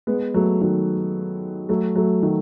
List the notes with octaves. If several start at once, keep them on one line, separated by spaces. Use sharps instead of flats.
G#3 B3
F#3 A3
D#3 F#3
F#3 A3
F#3 A3
D#3 F#3